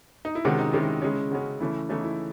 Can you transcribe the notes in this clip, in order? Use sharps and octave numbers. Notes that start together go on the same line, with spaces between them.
D#4
E4
C3 D#3 G#3 C#4 F#4
D#4
C3 D#3 G#3 C#4 E4
C#3 G#3 C#4
C#3 G#3 C#4 F#4
C#3 E3 A3 C#4 E4
C#3 E3 A3 C#4 D#4
E4